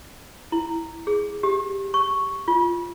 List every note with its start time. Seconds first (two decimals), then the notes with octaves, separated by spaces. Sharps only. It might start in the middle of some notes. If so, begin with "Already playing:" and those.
0.52 E4
1.07 G#4
1.43 G4
1.94 C#6
2.48 F4